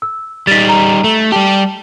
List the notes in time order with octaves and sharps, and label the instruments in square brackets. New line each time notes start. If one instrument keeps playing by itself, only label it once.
[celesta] E6
[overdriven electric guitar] G3 D#4 [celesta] A6 B6
[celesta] A#5
[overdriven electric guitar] A3
[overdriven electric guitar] G3 G4 [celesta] A5